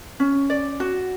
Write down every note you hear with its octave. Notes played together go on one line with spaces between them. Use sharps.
C#4
D5
F#4